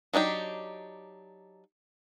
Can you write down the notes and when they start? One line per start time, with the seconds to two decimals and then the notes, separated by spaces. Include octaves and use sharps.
0.13 F#3 D4 D#4 G4